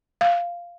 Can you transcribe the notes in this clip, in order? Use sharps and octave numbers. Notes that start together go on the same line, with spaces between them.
F5